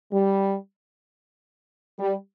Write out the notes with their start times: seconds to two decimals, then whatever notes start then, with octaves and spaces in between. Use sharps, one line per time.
0.12 G3
1.99 G3